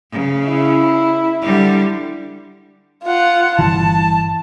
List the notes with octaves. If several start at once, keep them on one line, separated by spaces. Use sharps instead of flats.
C#3
E4
D3 G3
F4 F#5
G1 C2 E3 A5